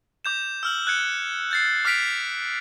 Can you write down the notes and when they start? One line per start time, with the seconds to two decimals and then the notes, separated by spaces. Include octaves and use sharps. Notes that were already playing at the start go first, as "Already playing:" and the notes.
0.25 D6 G6 E7
0.63 E6 F6 F#7
0.87 F#6 G#6 C#7
1.51 G6 A6 C7
1.85 D6 F6 A6 B6 D7 F7